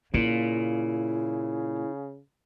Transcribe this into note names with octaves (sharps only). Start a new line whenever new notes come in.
A#2 C#3 A#3 E4